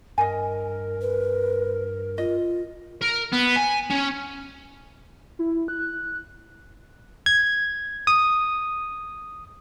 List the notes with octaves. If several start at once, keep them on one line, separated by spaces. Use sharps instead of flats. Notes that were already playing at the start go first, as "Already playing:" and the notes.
G2 A#4 D#5 G#5
B4
F4 D#5
A#4
B3
G#5
C#4
E4
F#6
G#6
D#6